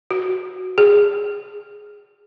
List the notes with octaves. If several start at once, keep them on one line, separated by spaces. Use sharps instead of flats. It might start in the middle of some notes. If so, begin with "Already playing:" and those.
F#4
G#4